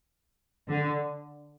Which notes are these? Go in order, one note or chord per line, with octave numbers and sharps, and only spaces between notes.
D3